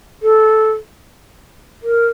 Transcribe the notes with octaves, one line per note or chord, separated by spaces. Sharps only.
A4
A#4